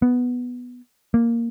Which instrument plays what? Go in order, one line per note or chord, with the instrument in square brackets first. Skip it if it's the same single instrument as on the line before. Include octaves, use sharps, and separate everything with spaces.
[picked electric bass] B3
A#3